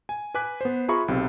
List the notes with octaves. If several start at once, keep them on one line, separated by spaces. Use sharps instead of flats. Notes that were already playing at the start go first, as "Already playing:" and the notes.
G#5
B4 G#5 D6 F#6 B6
B3 C5
F4 G#4 E5 A#5 B5 C#6
B1 C3